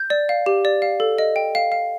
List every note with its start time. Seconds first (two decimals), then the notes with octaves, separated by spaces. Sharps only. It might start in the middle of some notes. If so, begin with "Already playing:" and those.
Already playing: G6
0.10 D5
0.29 F5
0.46 G4
0.65 D5
0.82 F5
1.00 A4
1.18 D#5
1.36 G5
1.55 F5
1.72 F5